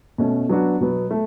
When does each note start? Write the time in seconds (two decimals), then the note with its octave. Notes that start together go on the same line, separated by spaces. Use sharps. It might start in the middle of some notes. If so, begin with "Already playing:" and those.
0.18 B2 A3 C#4
0.49 F#3 B3 D4 F#4
0.80 B2 F#3 B3
1.11 A3